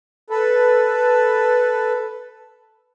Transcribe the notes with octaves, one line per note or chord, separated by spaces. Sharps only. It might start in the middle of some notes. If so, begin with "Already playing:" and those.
A4 B4